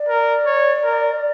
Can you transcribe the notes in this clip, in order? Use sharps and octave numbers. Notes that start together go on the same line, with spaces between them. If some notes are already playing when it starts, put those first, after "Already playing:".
Already playing: D5
A#4
C#5
A#4